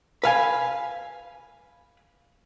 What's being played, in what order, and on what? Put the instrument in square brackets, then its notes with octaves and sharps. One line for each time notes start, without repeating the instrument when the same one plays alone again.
[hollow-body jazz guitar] B4 F5 G#5